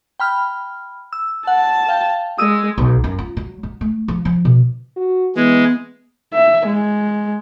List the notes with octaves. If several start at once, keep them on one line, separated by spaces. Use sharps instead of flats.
G5 B5 F6
E6
F#5 A5
F5 G5
G#3 D#6 E6 D#7
B1
F#2
F4
F#3
F#3
A3
F3
F3
B2
F#4
E3 G#3 B3
E5
G#3